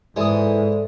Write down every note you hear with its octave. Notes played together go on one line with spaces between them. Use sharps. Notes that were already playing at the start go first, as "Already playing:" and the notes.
G#2 E3 G#3 A4 C5 D5 D#6